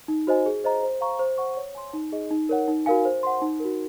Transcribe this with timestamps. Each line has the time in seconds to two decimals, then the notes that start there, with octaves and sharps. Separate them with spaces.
0.08 D#4
0.27 F#4 C5 D#5 G#5
0.46 G#4
0.64 C5 D#5 A#5
0.83 C5
1.01 F5 A#5 C#6
1.19 C5
1.38 F#5 C#6
1.57 C#5
1.75 G#5 C6
1.93 D#4
2.12 G#4 D#5
2.31 D#4
2.49 A#4 C#5 F#5
2.68 D#4
2.86 F#4 A#4 F5 G#5
3.05 C5
3.23 F#5 C6
3.42 D#4
3.60 F#4 A#4